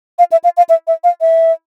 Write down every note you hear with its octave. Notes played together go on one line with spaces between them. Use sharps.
F5
E5
F5
F5
E5
E5
F5
E5